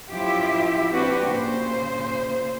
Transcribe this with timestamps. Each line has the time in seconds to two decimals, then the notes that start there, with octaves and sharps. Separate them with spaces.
0.11 F#2 F3 E4 F4 G4 E5
0.93 C4 D4 F#4 G4 B4
1.26 A#2 C#3 C5